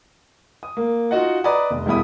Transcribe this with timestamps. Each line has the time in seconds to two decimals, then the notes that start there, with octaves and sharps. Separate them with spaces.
0.63 D#6
0.77 A#3
1.11 D#4 F4 F#4 D#5 F#5
1.44 B4 D5 D#5 A#5 D#6
1.71 F1
1.86 E1 G3 E4 B5 D#6